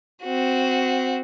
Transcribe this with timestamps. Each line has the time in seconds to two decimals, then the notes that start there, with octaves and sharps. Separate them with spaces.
0.23 C4 F#4